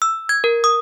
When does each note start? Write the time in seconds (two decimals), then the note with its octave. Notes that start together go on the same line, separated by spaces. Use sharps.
0.02 E6
0.29 G#6
0.44 A#4
0.64 D#6